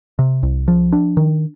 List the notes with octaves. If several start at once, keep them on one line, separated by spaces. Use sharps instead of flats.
C3
C2
F3
D4
D#3